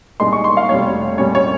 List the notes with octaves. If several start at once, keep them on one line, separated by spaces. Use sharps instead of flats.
C2 A#2 G#3 D#4 C6
C#6
C6
F5
F1 F2 C3 G3 C#5
C2 A#2 G3 C#4 C#5
C#5